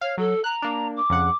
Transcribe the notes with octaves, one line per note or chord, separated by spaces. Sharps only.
C#5 F5
F#3 A4
A#5 F#6
A#3 D4
D6
F2 C#3 F#5